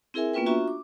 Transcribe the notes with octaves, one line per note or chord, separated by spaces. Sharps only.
C4 E4 G#4 A#4 E5 G#5
A#3 B3 C#4 F4 B4 G5
D4 F4 F#4 E5 A#5 C#6
D6